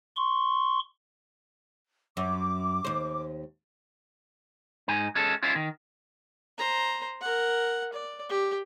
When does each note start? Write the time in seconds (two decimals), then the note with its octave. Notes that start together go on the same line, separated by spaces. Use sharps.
0.16 C6 C#6
2.17 F#2 D6
2.85 D#2 C5
4.88 G#2 D#4 G#5
5.15 G#3 C#4 A4
5.43 C#4 E4 F4
5.55 D#3
6.58 C5 A#5
7.21 A#4 F#5
7.93 D5
8.29 G4